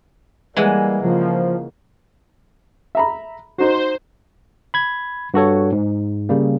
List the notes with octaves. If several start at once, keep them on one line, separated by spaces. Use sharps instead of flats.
E3 G3 G#3 A#3 F#5
C#3 F3 A#3
E5 A#5 B5
D#4 F#4 C5
B5 G#6
G2 F#4 A4 C#5
G#2
C#3 G3 A#3